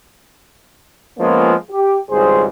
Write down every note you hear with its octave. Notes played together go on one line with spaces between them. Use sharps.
F3 G#3 A#3 B3 C#4 F4
G4
G#1 C#2 G3 G#4 C5